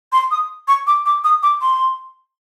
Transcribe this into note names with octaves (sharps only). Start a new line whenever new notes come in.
C6
D#6
C#6
D6
D6
D#6
D6
C6